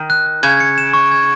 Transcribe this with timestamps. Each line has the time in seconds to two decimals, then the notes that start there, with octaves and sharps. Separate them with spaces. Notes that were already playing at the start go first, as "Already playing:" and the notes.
Already playing: D#3
0.10 F#6
0.27 F#6
0.43 C#3 G#6
0.60 C#7
0.78 E7
0.94 C#6
1.11 G#6